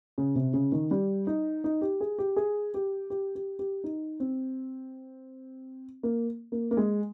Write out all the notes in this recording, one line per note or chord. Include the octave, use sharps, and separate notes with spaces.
C#3
C3
C#3
D#3
G3
D#4
D#4
G4
G#4
G4
G#4
G4
G4
G4
G4
D#4
C4
A#3
A#3
A#3
G#3